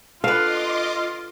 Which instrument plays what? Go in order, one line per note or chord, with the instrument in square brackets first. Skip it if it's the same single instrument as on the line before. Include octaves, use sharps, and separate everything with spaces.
[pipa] D3 B4 [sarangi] F4 [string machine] D#5 C6 D6 [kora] F5